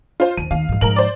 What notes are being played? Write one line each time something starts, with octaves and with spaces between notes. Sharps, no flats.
F4 C5
D#2 D#7
D#2 D#3 F5
G#2 E3
G#2 F3 A#4 F#7
C5 D5